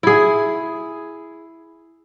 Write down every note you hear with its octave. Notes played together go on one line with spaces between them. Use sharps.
E4 G#4